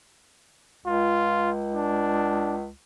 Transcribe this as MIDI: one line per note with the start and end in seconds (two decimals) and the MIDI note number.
0.86 2.69 37
0.86 1.51 65
1.74 2.55 62